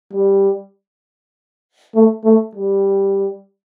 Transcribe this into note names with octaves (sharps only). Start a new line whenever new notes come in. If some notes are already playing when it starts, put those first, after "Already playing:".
G3
A3
A3
G3